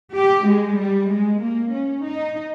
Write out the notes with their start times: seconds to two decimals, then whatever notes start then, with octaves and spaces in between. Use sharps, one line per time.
0.17 G4
0.49 G#3
0.80 G3
1.12 G#3
1.43 A#3
1.75 C#4
2.06 D#4